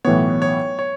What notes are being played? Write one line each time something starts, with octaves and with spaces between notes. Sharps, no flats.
B1 A2 E3 B3 C#5
C#5
C#5